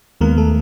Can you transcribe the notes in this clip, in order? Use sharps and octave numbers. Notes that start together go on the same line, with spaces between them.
D#2 D#3 G#3 A#3 B3 A#4
A3 A4